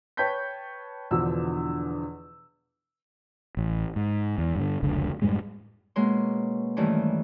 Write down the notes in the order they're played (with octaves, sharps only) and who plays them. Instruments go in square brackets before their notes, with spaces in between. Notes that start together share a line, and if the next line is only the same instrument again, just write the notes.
[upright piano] B4 C#5 G5 A5 G6 B6
E2 B2 D3 F3 D4 E6
[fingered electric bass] A1
G#2
E2
G2 B2 D3
F1 C#2 D3
F#2 A2 G3 G#3
[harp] B2 G#3 A#3 C#4 C6
G2 D#3 E3 A3 C#4 E4